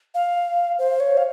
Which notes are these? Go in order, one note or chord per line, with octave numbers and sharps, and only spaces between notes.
F5
C5
C#5
F5